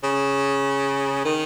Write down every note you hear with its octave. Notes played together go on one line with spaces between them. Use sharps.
C#3
D#3